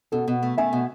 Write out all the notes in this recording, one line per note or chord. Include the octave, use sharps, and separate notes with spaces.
B2 A4
B2
A3
A3 E5 G#5
B2